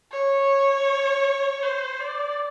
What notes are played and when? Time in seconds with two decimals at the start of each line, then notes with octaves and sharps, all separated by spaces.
0.12 C#5
1.63 C5
2.00 D5